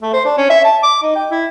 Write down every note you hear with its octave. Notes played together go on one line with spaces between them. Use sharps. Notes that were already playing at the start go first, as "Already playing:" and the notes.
A3
C5
D4
C#4
E5
A5
D6
D#4
G5
E4